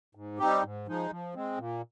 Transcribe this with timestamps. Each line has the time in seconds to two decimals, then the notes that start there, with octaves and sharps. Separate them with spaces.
0.15 G#2
0.39 G3 C4 D#4 G4
0.63 G#2
0.88 F3 G#3 D#4
1.11 F3
1.35 G#3 C4
1.58 A#2